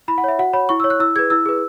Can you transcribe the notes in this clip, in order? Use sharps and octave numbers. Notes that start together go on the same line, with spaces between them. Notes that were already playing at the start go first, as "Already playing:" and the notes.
E4 B5
F#5
C#5 E5
F#4 F#5
C#5 B5
E4 C#6
C#5 E6
F#6
E4 E6
G#4 B4 G#6
E4 E6
G#4 B4